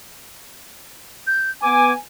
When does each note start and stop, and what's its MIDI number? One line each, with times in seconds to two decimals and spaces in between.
1.27 1.51 91
1.62 1.91 59
1.62 1.91 80
1.62 1.93 86